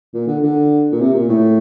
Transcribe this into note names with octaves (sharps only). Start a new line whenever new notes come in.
A#2
D3
D3
A#2
C3
A#2
A2